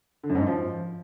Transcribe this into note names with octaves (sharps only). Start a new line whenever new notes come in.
D3
F#2
G#2
F#2
F3